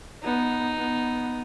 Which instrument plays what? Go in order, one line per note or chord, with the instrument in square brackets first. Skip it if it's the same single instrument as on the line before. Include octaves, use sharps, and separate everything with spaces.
[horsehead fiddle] B3 [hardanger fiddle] D#4
[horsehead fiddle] B3